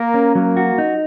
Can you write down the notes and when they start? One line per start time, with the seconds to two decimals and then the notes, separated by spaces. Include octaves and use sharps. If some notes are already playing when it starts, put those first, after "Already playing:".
Already playing: A#3 A#4
0.14 C#4
0.35 F#3 A#3
0.57 F#4
0.78 D#4